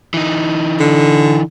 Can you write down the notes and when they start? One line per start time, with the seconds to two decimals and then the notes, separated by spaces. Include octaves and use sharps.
0.14 E3 D#4
0.80 D3